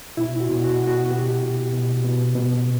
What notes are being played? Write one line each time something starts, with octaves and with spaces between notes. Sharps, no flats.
B2 E4
F#4
B2
F#4
B2
F#4
B2 G4
B2
B2
B2
B2